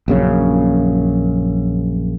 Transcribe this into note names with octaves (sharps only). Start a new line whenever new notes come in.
A#1 F#2 C#3